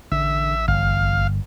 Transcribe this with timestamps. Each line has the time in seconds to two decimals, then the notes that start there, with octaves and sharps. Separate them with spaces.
0.12 A1 D3 E5
0.68 G1 F5